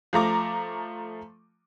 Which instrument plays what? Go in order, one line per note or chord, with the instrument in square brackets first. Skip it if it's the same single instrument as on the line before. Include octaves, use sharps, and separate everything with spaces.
[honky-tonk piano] F3 A3 A#5 D6